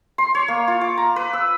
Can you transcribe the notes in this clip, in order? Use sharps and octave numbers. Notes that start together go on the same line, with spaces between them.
C6
C#5
A#3
F4
D6
A#5
B4
E6